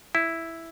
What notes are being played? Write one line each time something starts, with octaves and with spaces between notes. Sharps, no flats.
E4